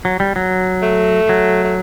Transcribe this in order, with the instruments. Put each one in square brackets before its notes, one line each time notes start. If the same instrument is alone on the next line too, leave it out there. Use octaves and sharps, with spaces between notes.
[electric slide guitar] F#3
G3
F#3
[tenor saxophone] A3
[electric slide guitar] F#3
[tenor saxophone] A3